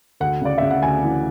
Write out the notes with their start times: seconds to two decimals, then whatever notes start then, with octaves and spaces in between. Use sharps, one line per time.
0.20 D2 F#5
0.41 C#3 D5
0.58 C#3 E5
0.71 F#5
0.82 D2 G#5
1.04 E3